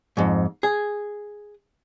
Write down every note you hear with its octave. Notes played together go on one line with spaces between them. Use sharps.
F2 G#2
G#4